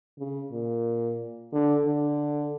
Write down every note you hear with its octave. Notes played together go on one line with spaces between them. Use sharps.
C#3
A#2
D3
D3